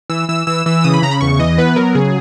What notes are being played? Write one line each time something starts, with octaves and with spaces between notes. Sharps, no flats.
E3 E6
E3 E6
E3 E6
E3 E6
C#3 D#6
B5
C#3 A#5
B5
E2 C#6
E3 D#5
B3 B4
F#3 A#4
C#3 G#4